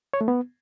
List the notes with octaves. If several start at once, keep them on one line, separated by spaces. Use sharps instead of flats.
C#5
A3
B3